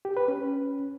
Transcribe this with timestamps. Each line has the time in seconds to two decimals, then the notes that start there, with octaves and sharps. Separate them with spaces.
0.05 G4
0.17 B4
0.28 C#4